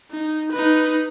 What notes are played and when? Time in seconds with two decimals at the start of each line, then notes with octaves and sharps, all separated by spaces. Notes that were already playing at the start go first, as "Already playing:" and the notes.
0.11 D#4
0.52 D#4 B4